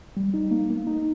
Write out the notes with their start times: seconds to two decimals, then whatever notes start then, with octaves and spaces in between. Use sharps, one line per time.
0.17 G3
0.34 D#4
0.51 A#3
0.70 A#3
0.87 D#4